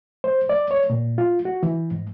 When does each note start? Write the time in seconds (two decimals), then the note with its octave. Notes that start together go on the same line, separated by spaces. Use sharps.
0.24 C5
0.49 D5
0.71 C#5
0.90 A#2
1.18 F4
1.45 F#4
1.63 E3
1.91 G#2